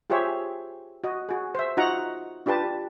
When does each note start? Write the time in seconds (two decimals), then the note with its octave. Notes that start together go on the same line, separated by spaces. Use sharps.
0.10 F4 G4 G#4 C5 C#5 E5
1.04 F#4 D#5
1.29 F#4 G#4
1.55 C5 E5
1.77 D#4 F4 F#4 F#5 A#5
2.46 D4 F4 G4 B4 A5